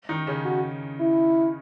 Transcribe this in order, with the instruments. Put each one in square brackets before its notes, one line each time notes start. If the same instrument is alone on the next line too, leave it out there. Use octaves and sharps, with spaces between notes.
[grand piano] D#3 D#4
C#3 C#4
[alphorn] F#4
E4